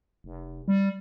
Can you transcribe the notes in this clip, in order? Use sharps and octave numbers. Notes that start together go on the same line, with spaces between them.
F1
G3